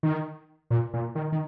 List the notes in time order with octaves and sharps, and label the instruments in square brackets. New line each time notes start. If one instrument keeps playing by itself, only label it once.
[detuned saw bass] D#3
A#2
A#2
D#3
D#3